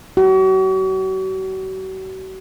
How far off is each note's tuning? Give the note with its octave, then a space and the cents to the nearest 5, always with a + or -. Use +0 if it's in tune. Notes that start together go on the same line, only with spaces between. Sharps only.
F#4 +40